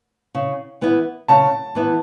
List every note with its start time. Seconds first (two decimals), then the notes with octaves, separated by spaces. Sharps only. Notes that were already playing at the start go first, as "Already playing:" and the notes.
0.35 C#3
0.81 E3 B3 E4
1.28 C#3 A5
1.75 E3 B3 E4